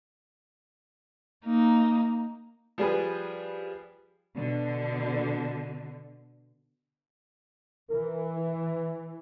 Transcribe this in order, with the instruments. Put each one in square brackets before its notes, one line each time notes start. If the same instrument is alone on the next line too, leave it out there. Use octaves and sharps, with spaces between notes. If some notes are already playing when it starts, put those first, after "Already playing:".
[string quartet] A#3 D#4
[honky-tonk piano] F3 G3 G#4 B4
[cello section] B2 D3
[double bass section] E3 [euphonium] A#4
[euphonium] E4